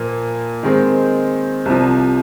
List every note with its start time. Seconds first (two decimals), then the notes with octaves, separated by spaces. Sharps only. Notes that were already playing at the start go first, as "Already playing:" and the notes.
Already playing: A#2 F3 A#3
0.63 D#3 G#3 C4
1.65 C2 C3 F3